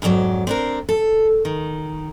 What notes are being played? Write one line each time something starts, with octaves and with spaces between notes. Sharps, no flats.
F2 G#2 B2 F#3 D5
C4 D4 A#4
A4
D#3